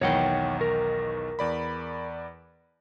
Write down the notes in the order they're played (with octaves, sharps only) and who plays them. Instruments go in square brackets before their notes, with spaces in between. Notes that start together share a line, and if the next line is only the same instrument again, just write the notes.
[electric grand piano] B1 E2 D#3 [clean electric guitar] C#5 F#5 G5
[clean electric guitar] A#4
[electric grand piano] E2 D5 B5